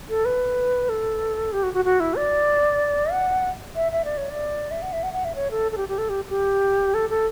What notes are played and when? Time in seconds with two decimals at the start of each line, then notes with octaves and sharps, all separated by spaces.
0.09 A4
0.25 B4
0.89 A4
1.52 G4
1.63 F#4
1.74 F#4
1.85 F#4
2.00 E4
2.17 D5
3.12 F#5
3.75 E5
3.92 E5
4.05 D5
4.17 C#5
4.30 D5
4.71 E5
4.82 F#5
4.92 E5
5.03 F#5
5.13 F#5
5.25 E5
5.35 C#5
5.51 A4
5.72 A4
5.77 G4
5.88 G4
5.98 A4
6.09 G4
6.30 G4
6.94 A4
7.10 A4